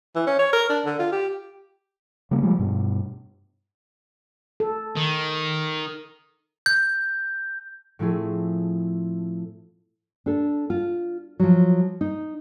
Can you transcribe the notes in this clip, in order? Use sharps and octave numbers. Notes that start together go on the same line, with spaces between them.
E3
C#4
C#5
A#4
D4
D3
F4
G4
C#3 G3 A#3
F3 G3 G#3
G2 B2
A4
D#3
G6
A2 F3 A3 C4 E4 G#4
D4 A4
F4
F3 F#3
D#4